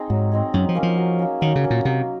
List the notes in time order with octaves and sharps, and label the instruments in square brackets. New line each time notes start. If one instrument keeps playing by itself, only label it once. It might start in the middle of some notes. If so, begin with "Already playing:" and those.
Already playing: [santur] C4 D#4 G#4
[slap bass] G#2 [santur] F#3
[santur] C4 D#4 G#4
[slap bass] F#2 [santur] F#3
[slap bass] F3
[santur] A#3 C#4
[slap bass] F3
[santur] F#3
A#3 C#4
[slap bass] D#3 [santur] F#3
[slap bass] C#3
[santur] A#3 C#4
[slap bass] A#2
[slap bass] C3 [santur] F#3